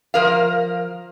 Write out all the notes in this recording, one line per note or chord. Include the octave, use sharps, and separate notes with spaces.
F3 A#4 F5